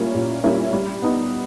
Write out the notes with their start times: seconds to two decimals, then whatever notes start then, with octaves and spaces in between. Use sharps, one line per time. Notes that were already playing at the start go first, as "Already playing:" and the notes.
Already playing: A#2 G3 A#3 C#4 E4
0.15 A#2
0.44 G3 A#3 C#4 E4
0.73 G3
1.02 B3 D#4